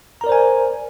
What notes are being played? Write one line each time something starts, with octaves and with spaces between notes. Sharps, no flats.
A#4 C5 D5 G#5 A#5